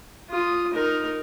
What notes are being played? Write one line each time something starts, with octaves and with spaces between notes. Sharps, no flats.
F4 D#6
D#4 A#4